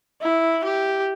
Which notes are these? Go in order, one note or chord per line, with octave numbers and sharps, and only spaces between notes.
E4
G4